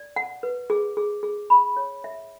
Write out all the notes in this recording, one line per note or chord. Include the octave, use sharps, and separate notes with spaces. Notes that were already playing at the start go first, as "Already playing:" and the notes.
Already playing: D5
F#5
B4
G#4
G#4
G#4
B5
C#5
E5